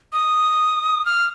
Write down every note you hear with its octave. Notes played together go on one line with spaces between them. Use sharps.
D#6
F6